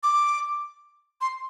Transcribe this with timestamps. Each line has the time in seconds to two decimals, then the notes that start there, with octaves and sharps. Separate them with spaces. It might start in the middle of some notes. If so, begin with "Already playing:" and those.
0.03 D6
1.21 C6